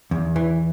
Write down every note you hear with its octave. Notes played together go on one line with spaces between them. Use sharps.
E2
E3